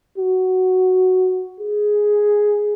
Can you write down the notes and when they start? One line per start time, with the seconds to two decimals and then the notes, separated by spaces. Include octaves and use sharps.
0.18 F#4
1.60 G#4